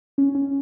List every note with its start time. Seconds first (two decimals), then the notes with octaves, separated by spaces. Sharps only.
0.18 C#4
0.35 C#4